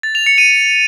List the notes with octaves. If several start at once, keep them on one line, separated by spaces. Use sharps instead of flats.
A6
F7
C#7
D#7